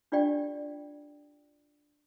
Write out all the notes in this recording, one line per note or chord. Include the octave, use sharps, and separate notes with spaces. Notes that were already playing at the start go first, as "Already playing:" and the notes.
D4 F4 G4 D5 G5